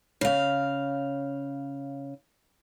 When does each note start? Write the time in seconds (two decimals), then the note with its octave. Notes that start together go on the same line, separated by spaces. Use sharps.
0.21 C#3 F5